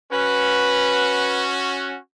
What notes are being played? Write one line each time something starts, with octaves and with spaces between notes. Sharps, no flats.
C#4 F#4 B4